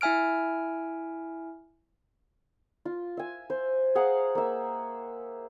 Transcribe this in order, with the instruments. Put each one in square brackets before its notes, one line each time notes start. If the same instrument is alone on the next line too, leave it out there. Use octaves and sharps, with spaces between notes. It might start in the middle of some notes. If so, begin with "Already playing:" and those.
[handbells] E4 E5 G#5 F6 D7
[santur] F4
E5 G#5
C5
G#4 F5 F#5 A#5
A#3 E5